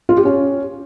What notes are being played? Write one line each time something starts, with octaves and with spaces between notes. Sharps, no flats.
F4
G4
C#4